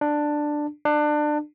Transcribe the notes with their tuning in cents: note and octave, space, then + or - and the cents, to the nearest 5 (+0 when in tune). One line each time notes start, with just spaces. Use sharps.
D4 +10
D4 +25